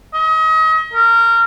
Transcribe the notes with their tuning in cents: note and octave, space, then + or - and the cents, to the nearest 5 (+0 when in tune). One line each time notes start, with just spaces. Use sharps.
D#5 +35
A#4 -20